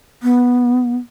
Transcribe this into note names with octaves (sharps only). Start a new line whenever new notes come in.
B3